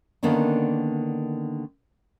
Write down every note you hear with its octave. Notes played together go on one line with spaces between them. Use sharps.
D3 D#3 A#3 B3 C#4 D4